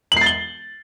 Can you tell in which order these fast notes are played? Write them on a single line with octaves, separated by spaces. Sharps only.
F#7 C7 A6 G7